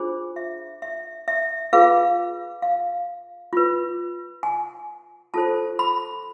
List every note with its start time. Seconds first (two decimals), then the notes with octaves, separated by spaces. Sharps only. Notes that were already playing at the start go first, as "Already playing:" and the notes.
Already playing: D4 F4 G#4 C5
0.36 E5
0.82 E5
1.28 E5
1.73 F4 G#4 B4 F5
2.62 F5
3.53 F4 B4
4.43 G#5
5.34 F4 A4 C5 A5
5.79 B5